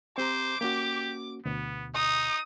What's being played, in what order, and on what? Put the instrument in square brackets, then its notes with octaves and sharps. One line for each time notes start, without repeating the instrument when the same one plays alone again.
[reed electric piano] C4 G4 A#5 [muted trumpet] C5 [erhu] D6
[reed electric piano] A#3 C#4 F#4 [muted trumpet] G4
[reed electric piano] D2 B2 [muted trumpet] B3
[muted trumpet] D#4 [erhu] D#6